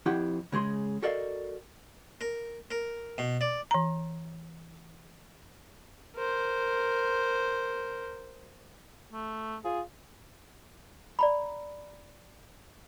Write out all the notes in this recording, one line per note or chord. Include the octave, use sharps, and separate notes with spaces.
F2 E4 G4 F#5 G5
C#3 G#3 G#4 C6
F#4 A4 A#4 D5 D#5 F5
A#4
A#4
B2
D5
E3 A#5
A#4 C5
A3
F4 G#4
D5 A#5 B5